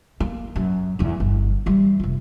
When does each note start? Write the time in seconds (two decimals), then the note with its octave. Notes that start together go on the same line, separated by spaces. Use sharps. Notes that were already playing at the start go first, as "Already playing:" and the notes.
0.20 A#3
0.56 F#2
0.99 E2 D3
1.20 G1
1.66 E3 G3
2.00 F1 F4